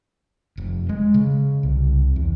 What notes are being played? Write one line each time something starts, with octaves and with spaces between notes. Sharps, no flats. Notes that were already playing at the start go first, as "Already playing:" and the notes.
F1
G#3
C#3
C2
E2